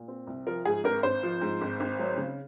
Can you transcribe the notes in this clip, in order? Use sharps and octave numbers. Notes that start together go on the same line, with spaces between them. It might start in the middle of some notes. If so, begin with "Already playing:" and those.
Already playing: A#2
C4
C2
F3 A#4
G#2 G#4
G#1 A#4
G#1 C5
F3
G#2
G#1
G#1
F#3
C#3